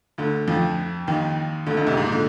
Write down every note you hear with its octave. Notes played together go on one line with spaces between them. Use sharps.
D2 D3
F2 F3
D#2 D#3
D2 D3
D2 D3
C2 C3
G#2
A#2
D3